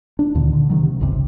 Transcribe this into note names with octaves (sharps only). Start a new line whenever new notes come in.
D4
D2 A#2 D3 D#3
D3
C3 D#3 F#3
C3
G#1 C#2 G#2 C3